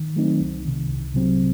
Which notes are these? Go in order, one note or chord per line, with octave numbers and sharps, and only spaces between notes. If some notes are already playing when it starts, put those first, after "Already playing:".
Already playing: D#3
F#3 A3 C4 D#4
C2
C3 D#3
C2
C3 F#3 C4